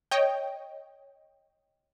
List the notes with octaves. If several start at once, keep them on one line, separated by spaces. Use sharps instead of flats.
C#5 D#5 G5